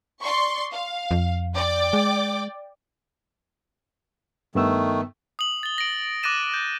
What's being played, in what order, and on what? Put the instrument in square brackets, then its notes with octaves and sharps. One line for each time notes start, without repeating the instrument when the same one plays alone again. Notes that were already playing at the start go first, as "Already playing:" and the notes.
[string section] D5 C6 C#6
F5
[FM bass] F2
[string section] D5 G5 D6
[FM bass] G#3
[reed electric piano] G2 B3 E6 [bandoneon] D#3 A3
[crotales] D#6 F#7
A6 G7
A#6 D7
D6 F#6 A6 A#6 D#7 E7
G6